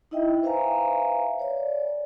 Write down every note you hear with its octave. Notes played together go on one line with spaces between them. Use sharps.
D#4 E4 D#5 E5 G5
B4 C5 E5 F5 G#5 A#5
C#5 D5